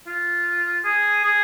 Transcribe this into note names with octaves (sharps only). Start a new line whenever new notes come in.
F4
G#4
G#4